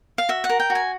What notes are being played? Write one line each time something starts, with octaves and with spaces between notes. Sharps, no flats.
F5
F#4 E5
F#5
A#4
G5
F#4
G#5